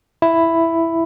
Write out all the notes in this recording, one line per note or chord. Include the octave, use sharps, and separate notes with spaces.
E4